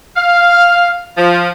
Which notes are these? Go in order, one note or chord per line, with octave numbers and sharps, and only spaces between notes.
F5
F3